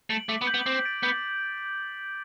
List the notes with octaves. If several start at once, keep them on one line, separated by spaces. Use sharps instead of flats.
A3 D7 F#7
A3 D6
B3
G6 B6 F#7
B3
C4 D6
A6 D7
B3 G6